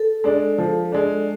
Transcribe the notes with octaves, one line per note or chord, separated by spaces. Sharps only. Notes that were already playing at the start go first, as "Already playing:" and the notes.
Already playing: A4
G#3 D4
F3
G#3 D4